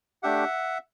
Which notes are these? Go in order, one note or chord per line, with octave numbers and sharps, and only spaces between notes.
A3 D4 G4 E5 F#5